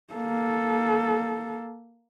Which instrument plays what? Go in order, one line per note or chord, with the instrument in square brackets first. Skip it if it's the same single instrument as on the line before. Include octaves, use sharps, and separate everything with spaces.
[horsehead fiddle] A#3 A4